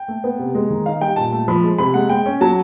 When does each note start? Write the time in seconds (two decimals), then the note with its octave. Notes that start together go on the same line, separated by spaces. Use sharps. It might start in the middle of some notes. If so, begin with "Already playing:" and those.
Already playing: G5
0.08 A3
0.24 B3
0.39 C3
0.55 G#3
0.70 D#3
0.86 D#4 F5
1.01 G3 G5
1.16 A#2 A5
1.32 A3
1.48 F3 B5
1.63 G#3
1.78 C3 B5
1.94 G#3 F#5
2.09 G#3 G5
2.26 C#4
2.41 F#3 A5